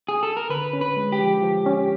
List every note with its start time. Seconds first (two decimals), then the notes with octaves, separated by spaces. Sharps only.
0.09 G#4
0.23 A4
0.37 A#4
0.49 D3 B4
0.73 C#4
0.81 B4
0.97 G#3
1.12 G4
1.19 F3
1.42 F3
1.66 C#4